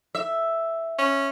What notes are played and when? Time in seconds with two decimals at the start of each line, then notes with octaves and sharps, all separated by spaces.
0.15 E5
0.99 C#4